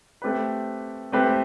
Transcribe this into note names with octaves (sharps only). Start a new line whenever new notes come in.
A3 C4 G4 B4
A3 C4 G4 B4